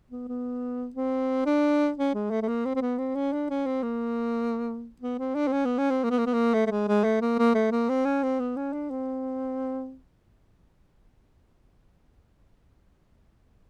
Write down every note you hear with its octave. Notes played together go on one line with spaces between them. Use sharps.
B3
B3
C4
D4
C#4
G#3
A3
A3
A#3
C4
C4
B3
C4
C#4
D4
C#4
C4
A#3
B3
C4
D4
C4
C#4
B3
C#4
C4
A#3
B3
A#3
B3
A#3
A3
A3
G#3
G#3
A3
A#3
A#3
A3
A#3
C4
C#4
C4
B3
C#4
D4
C4